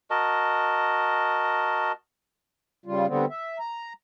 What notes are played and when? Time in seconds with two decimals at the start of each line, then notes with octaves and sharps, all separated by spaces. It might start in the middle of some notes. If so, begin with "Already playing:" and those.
0.10 F#4 A#4 D#5 A5
2.86 C#3 G3 F4
3.08 D3 G3 B3 C4
3.30 E5
3.59 A#5